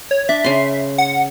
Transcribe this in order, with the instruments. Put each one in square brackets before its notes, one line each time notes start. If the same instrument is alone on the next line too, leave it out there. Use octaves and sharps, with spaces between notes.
[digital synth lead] C#5
[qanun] D4 [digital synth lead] E5
[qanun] C#3 C6
[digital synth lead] F#5